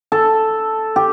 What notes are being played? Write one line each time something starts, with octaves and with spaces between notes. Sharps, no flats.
A4
G4